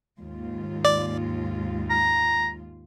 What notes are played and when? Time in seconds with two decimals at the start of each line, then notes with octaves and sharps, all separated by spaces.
0.19 D#2 G#2 F4
0.85 D5
1.90 A#5